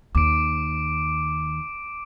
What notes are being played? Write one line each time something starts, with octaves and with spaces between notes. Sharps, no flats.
D#2 D6 D7